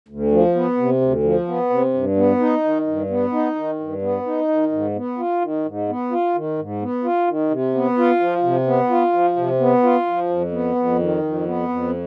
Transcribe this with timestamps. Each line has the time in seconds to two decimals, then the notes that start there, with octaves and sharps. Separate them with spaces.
0.08 D2
0.31 F3
0.55 B3
0.78 C3
1.01 D2
1.23 F3
1.48 B3
1.70 C3
1.94 G2
2.16 B3
2.40 D#4
2.64 D#3
2.87 G2
3.10 B3
3.32 D#4
3.56 D#3
3.80 G2
4.02 B3
4.26 D#4
4.48 D#3
4.72 G#2
4.96 B3
5.18 F4
5.41 D#3
5.66 G#2
5.89 B3
6.11 F4
6.35 D#3
6.58 G#2
6.82 B3
7.04 F4
7.27 D#3
7.50 C3
7.75 B3
7.98 F4
8.20 F3
8.43 C3
8.67 B3
8.90 F4
9.13 F3
9.36 C3
9.60 B3
9.83 F4
10.06 F3
10.29 F2
10.52 B3
10.75 F2
10.99 D#3
11.23 F2
11.46 B3
11.68 F2